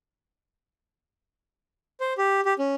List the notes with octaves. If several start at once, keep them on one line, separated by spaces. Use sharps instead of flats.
C5
G4
G4
C#4